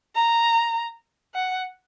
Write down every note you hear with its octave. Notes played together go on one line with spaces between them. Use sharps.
A#5
F#5